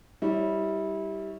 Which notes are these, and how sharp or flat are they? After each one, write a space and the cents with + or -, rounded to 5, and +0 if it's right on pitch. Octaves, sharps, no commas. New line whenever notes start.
G3 +0 E4 -30 C#5 +0